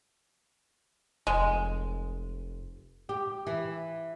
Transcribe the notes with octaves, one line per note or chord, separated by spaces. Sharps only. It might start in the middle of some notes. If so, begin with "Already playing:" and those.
F1 G#3
G4
E3